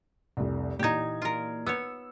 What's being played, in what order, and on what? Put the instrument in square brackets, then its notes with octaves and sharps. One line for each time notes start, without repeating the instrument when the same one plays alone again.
[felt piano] F1 C2
[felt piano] A#2 E3 G#6 [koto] D#4 G4
[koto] F4 A#4
[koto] B3 C#5 [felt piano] E6